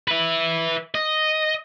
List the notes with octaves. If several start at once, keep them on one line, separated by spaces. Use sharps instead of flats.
B4 E5
D#5